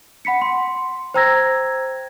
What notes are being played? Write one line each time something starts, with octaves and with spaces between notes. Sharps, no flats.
F#5 B5 B6 C#7
C6
C5 G5 A#5 E6 G#6 A#6